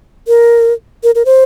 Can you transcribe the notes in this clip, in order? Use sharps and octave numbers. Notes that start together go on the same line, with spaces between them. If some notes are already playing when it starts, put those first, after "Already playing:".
A#4
A#4
A#4
C5